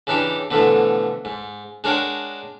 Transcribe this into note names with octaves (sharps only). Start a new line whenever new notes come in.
C#3 E3 D4 D#4 G4
B2 D3 E3 F3 A3
G#2
G#3 D4 A#4 C#5 F#5 G5